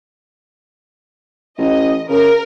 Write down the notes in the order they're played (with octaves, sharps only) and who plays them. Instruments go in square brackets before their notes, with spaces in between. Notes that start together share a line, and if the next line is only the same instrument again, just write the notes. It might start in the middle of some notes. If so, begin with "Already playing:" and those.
[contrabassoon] A1 [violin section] D#5
[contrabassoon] C#3 [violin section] A#4